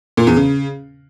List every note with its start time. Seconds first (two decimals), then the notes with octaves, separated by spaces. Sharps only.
0.17 A#2
0.27 E2
0.37 C#3